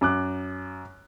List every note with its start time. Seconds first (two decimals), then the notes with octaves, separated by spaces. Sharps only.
0.01 F#2 D6 F#6